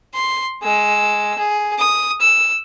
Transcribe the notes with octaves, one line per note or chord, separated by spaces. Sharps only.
C6
G#3 E6
G#4
D#6
E6